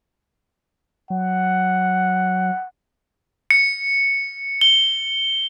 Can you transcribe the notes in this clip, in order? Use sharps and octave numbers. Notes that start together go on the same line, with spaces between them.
F#3 F#5
C#7
G7